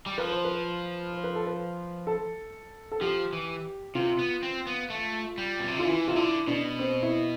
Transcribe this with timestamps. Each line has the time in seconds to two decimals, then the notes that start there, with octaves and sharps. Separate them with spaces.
0.06 G3
0.18 F3 B4
0.31 C5
0.45 B4
1.12 C5
1.24 B4
1.35 A4
1.47 B4
2.07 A4
2.92 A4
3.01 F3 G4
3.33 E3
3.95 C3 F4
4.19 B3
4.43 C4
4.67 B3
4.90 A3
5.38 G3
5.60 B2
5.68 C3
5.77 D3 F4
5.85 E3 E4
6.08 C3 F4
6.16 D3 E4
6.47 B2 D4
6.79 C4
7.02 E4